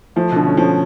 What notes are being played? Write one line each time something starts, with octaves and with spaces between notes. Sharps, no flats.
F3 A3
B2 D3
C#4
F3 C#4